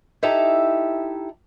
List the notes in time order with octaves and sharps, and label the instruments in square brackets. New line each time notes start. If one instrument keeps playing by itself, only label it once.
[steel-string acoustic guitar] D#4 E4 G4 A4 E5 A#5